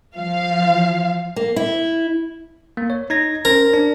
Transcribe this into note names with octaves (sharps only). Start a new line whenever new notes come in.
F3 F5
A#3
E4
A#3
C#5
D#4 G#6 A#6
C#4 A#4 C5
D4